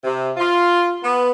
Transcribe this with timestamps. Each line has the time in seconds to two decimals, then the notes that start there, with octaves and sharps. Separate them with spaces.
0.03 C3
0.37 F4
1.03 B3